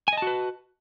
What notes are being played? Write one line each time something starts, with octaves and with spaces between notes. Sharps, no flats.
F#4 B4 D#5 G#5 A5